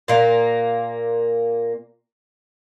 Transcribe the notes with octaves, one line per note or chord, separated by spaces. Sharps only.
A#2 A#3